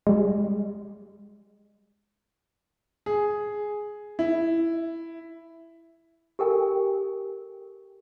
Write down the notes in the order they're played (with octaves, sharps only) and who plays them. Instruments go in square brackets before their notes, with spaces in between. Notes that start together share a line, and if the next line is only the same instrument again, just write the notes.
[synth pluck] G3 G#3
[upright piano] G#4
E4
[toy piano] G4 A4 A#4 G5 G#5